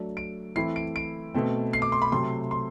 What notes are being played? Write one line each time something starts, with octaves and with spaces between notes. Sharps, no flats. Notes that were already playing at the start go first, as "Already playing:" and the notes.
Already playing: F#3 A3 D4
D7
E3 A3 C4 E4 C7
D7
D7
B2 A3 C4
C7
D6
C6
B5
C3 F#3 A3 C6
C6